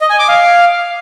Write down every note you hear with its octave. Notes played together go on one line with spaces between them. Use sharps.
D#5
G#5
D6
F5